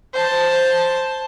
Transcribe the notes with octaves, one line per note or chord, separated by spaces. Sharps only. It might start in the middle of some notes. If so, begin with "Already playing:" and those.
C5 A5